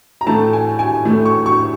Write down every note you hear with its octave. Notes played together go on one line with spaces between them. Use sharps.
A#5
A2 E3 A3 A5
G#5
G#5
A2 E3 A3
C#6
C#6